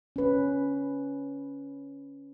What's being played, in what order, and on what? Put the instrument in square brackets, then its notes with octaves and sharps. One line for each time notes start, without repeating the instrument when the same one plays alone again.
[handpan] C#4 B4